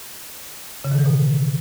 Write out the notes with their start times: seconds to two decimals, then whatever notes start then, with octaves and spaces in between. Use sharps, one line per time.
0.84 C#3
0.92 D#3
0.99 E3
1.06 B2